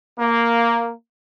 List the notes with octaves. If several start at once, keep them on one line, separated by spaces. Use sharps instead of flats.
A#3